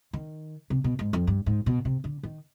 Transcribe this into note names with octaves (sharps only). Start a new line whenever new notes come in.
D#3
C3
B2
G#2
F2
G2
G#2
B2
C3
D3
D#3